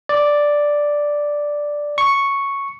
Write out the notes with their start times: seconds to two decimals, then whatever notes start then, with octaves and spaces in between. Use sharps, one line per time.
0.09 D5
1.98 C#6